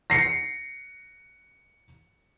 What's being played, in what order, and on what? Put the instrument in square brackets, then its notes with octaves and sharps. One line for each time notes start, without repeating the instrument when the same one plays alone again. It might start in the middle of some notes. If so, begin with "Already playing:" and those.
[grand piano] A#6 C7 C#7